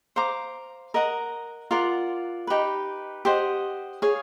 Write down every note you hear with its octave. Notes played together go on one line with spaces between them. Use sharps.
C5 F5 A#5 D6
A#4 D#5 F#5 A#5
F4 A#4 D5 F#5
D#4 G4 B4
G4 C5 D#5 F#5
G#4 C#5 F5